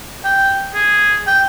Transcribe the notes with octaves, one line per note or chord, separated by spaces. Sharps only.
G5
G#4
G5